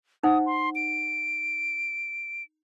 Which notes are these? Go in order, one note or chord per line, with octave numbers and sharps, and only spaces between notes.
D#4 C5 F#5 D#6
C6
D7